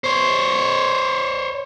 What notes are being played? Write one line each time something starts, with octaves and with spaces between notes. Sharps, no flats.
C5 C#5